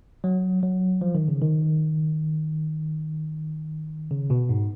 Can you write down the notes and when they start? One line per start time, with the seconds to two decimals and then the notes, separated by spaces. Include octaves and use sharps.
0.24 F#3
0.63 F#3
1.01 F3
1.15 D#3
1.28 C#3
1.41 D#3
4.11 C#3
4.30 B2
4.49 G#2